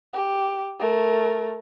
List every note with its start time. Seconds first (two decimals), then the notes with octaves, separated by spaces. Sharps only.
0.14 G4
0.79 A3 A#4